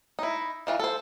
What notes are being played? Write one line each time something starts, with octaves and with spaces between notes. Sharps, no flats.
D#4 E4
D#3 E3 F4
A4 C5